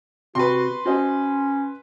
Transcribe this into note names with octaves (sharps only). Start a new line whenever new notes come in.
C3 F#4 B4 C6
C#4 F#4 C5 D#5